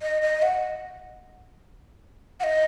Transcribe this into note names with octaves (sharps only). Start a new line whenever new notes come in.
D#5
D#5
F#5
F#5
D#5